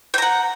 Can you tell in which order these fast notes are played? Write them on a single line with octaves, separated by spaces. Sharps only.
G5 A#5 F#5